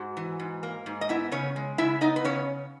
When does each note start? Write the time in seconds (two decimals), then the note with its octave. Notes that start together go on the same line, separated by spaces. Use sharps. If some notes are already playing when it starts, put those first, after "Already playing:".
Already playing: G#2 F#4 F#5
0.17 E3
0.40 G#2
0.63 A#3
0.86 G#2
1.01 D#5
1.09 B3 E4 E5
1.32 C#3 C#4 C#5
1.56 G#3
1.78 C#3 E4 E5
2.01 B3 D#4 D#5
2.16 B4
2.25 C#3 C#4 C#5